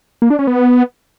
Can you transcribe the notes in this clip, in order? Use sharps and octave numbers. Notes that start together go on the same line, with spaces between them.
A#3
D4
C#4
B3